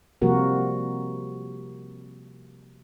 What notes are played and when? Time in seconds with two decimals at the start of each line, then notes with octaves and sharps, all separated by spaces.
0.22 C3 F3 G3 A#3 F#4 A#4